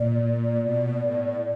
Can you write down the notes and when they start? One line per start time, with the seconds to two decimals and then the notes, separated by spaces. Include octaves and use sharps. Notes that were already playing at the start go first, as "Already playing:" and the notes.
Already playing: A#2 D5
0.64 B2
1.01 A2